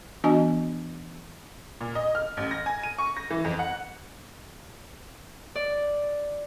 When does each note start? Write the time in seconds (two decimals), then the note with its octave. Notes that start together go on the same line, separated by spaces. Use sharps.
0.24 E3 B3 D4 F#4 D#5 G#5
1.81 A#2
1.95 D#5
2.15 F6
2.37 A1
2.51 A#6
2.66 G#5
2.83 D#7
2.98 C#6
3.17 A#6
3.30 E3
3.44 F2
3.59 F#5
5.55 D5